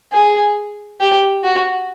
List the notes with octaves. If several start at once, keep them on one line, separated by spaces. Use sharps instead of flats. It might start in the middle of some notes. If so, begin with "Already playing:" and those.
G#4
G4
F#4